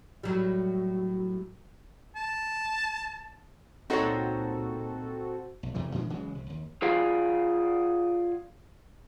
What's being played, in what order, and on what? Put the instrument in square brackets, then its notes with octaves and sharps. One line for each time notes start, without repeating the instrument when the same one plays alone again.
[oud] A2 F#3 G3
[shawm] A5
[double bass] C#2 A#2 [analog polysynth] C4 F#4 A4 [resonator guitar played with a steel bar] D#4 C5 C#5
[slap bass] B1
E2 C3 E3 A3
A#2 E3 G#3 D4
C#3 E3 F#3 G#3
C2
D#2
[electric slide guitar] F4 G#4 D5 F5 F#5